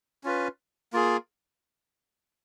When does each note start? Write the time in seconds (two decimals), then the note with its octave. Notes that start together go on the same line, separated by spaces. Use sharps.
0.24 C#4 F4 B4
0.93 A#3 F4 G#4